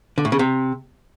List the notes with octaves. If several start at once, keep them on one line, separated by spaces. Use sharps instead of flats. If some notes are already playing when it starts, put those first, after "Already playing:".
D3
A2
C#3
C3